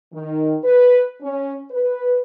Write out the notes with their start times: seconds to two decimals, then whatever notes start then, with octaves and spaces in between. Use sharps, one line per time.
0.13 D#3
0.64 B4
1.22 C#4
1.70 B4